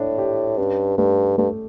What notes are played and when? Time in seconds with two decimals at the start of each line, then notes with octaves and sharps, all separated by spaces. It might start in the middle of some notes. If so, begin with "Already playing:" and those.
Already playing: A2 D4
0.18 G4
0.58 G2 C#4
0.98 G2 A3
1.38 G2 A3